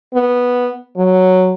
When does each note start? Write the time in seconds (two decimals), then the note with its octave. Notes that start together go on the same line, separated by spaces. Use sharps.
0.14 B3
0.97 F#3